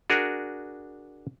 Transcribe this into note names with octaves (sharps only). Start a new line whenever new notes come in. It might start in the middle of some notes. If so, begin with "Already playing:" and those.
D4 F#4 G#4 A#4